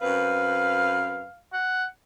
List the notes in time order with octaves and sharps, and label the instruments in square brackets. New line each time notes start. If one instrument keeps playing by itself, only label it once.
[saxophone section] F#2 C4 B4 [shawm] F5
[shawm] F#5